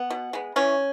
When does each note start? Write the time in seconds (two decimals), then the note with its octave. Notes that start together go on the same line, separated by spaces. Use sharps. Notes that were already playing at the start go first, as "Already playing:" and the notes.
Already playing: B3
0.10 B2
0.33 G#3 B3
0.56 E3 C#4